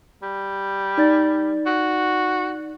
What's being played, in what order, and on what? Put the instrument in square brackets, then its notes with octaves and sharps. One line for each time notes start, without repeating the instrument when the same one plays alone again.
[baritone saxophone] G3
[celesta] D#4 D5 A6
[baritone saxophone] F#4